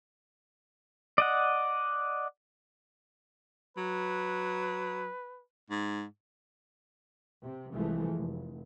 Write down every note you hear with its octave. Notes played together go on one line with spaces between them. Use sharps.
D5 D#5 F#5
F#3 B4
G#2
C3
C2 E3 F3 G#3 A3
F1